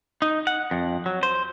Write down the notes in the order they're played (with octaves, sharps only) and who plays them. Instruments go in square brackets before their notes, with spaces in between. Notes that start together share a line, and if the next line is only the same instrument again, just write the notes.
[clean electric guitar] D#4
F#5
F2
F#3
C5